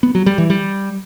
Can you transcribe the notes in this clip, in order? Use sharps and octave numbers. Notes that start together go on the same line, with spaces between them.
B3
F#3
G3
E3
G3